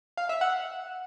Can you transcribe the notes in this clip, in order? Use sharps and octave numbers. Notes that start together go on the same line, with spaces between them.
F5
E5
F#5